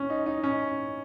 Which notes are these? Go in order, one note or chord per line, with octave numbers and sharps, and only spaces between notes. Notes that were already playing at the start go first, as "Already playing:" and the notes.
Already playing: C#4
D#4
D#4
C#4